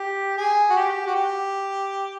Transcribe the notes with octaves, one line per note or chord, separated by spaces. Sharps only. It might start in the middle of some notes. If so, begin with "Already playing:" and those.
Already playing: G4
G#4
F#4
G4
F#4
G4